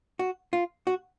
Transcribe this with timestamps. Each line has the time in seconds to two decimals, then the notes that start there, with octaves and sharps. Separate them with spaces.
0.19 F#4
0.53 F4
0.87 F#4